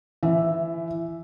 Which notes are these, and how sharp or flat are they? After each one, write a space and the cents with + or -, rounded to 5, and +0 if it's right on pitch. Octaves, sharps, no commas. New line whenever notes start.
E3 +25 E5 +0